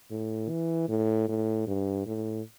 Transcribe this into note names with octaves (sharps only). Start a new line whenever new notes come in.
A2
E3
A2
A2
G2
A2